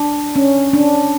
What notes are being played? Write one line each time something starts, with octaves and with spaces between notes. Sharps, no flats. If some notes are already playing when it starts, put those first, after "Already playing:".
Already playing: D4
C#4
D4